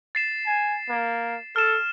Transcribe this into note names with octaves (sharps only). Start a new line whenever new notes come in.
A6 C7 E7
G#5
A#3
A4 F6 E7